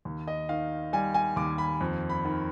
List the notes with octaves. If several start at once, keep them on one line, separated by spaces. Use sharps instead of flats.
D#2
D#5
D#3 F5
G3 G#5
G#5
D#2 D6
B5
F2
B5
D#3